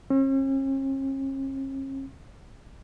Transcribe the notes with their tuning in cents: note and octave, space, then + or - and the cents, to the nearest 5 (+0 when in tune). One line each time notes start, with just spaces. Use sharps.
C#4 -45